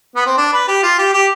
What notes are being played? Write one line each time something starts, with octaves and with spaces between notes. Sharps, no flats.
B3
C4
D4
B4
G4
F4
G4
G4